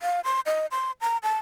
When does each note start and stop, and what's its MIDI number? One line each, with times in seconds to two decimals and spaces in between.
0.01 0.20 77
0.24 0.40 84
0.46 0.66 75
0.71 0.92 84
1.01 1.17 82
1.23 1.38 81